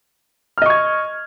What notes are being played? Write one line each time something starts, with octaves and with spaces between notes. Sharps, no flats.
D#5 C#6 F6 G#6